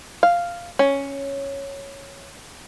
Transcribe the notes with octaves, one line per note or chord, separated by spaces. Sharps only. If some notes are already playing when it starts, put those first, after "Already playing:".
F5
C#4